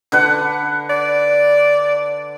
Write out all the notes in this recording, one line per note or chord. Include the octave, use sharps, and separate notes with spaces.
D3 B4 F#5
D5